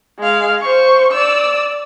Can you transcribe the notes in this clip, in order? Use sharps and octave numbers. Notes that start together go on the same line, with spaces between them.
G#3 F5
C5 C#6
D5 E6